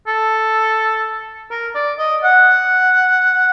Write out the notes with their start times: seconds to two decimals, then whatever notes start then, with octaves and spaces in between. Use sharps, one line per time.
0.07 A4
1.51 A#4
1.75 D5
1.99 D#5
2.24 F#5